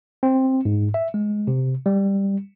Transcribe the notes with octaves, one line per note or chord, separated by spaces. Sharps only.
C4
G#2
E5
G#3
C3
G3